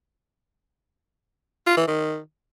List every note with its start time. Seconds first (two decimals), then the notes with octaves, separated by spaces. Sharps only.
1.67 F4
1.77 E3
1.88 D#3